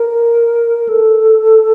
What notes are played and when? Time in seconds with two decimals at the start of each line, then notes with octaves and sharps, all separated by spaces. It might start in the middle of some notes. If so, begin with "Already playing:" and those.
Already playing: A#4
0.89 A4